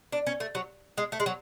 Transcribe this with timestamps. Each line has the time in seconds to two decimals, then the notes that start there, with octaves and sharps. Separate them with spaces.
0.12 D4
0.27 C#4
0.40 A3
0.55 F#3
0.98 G#3
1.12 A3
1.20 G#3
1.26 F#3